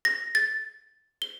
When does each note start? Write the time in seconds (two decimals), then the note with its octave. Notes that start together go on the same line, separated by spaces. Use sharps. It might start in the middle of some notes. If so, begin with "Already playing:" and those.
0.05 A#6
0.35 A6
1.22 G7